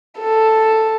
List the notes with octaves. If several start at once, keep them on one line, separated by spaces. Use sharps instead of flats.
A4